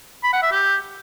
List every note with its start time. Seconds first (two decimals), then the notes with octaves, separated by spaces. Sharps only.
0.24 B5
0.33 F#5
0.42 E5
0.52 G4